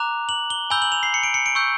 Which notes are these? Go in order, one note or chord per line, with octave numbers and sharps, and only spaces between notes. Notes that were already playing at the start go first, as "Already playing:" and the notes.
Already playing: A#5 D6 F#6 F7
F#7
G7
G#5 B5 E6 G6 G7
F#7
F7
C7
C#7
D7
C#7
D7
C#6 E6 G6